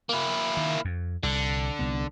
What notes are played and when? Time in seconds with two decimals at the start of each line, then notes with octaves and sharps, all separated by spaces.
0.09 A#3 E4
0.57 D#3
0.85 F2
1.23 C2 D3
1.79 C2 B3